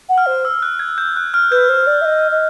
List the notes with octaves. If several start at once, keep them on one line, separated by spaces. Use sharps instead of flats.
F#5
F6
C5
E6
F#6
G#6
G6
F#6
F6
B4 G6
C5
D5
E5
D#5
D#5